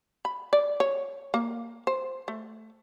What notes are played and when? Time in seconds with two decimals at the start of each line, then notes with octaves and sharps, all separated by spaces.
0.25 B5
0.53 D5
0.80 C#5
1.34 A#3
1.87 C5
2.28 A3